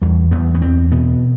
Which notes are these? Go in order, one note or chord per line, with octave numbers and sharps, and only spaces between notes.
E2 G3
E2 B3
B3
E2 C4
B2 B3